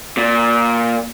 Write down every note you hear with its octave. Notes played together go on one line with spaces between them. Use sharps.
A#2